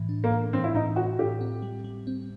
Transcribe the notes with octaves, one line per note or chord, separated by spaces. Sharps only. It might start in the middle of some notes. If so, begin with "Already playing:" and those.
Already playing: A2 E3
D4
A#3
A2
E3 C4
E4
A2 D#4
A2 F#4
A2 G4
C4
G3
G3
C4